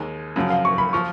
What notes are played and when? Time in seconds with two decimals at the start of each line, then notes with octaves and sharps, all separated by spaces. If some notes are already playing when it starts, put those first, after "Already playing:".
Already playing: D#2 D#3 G#3
0.36 F#2 C#3 F3
0.50 F5
0.65 C#6
0.78 B5
0.93 F3 C#6